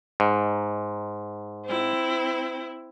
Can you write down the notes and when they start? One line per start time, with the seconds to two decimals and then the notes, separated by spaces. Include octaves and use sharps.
0.20 G#2
1.66 C4 E4